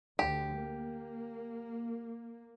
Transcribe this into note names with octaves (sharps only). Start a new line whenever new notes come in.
D2 D3 G4
A#3